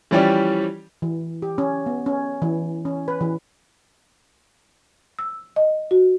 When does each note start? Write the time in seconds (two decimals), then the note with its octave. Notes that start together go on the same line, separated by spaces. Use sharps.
0.11 E3 F3 G3 C#4 G4 D5
1.02 E3
1.42 G4
1.58 C#4
1.86 B3
2.06 C#4
2.42 E3
2.85 C#4
3.08 B4
3.21 E3
5.19 E6
5.56 D#5
5.91 F#4